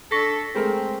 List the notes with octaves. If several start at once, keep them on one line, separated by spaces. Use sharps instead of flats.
D4 A4 C#6 A#6 B6
G#3 A3 C4 A#4